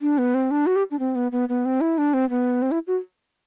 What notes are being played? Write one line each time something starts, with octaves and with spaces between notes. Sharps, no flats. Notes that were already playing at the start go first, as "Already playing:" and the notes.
D4
B3
C4
D4
F#4
G4
D4
C4
B3
B3
B3
C4
E4
D4
C4
B3
C4
E4
F#4